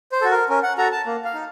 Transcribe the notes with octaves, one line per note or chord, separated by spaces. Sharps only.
C5
F#4 A4
A#4
C#4 A#4
F#5
F#4 A4 A#5
A5
A#3
F5
D#4